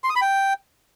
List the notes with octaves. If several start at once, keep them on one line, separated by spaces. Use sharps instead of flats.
C6
D#6
B5
G5